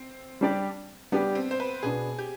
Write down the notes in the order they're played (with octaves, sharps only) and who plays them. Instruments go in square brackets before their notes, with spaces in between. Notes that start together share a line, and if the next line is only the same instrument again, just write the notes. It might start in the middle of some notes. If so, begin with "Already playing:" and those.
Already playing: [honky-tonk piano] C4
[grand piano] G3 D4 G4 D5
[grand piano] G3 D4 G4 D5 [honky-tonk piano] B3
[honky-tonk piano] C4
C5
B4
[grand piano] B2 B3 D4 [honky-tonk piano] G#4
[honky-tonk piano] G4